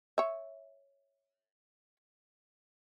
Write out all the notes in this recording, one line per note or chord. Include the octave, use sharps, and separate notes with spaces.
C#5 E5